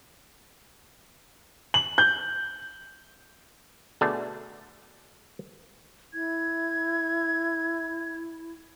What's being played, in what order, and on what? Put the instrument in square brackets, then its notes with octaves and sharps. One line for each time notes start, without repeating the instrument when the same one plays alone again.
[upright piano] F#7
G6
[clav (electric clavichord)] B2 D3 A3 D4 G#4 A5
[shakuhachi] E4 [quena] G#6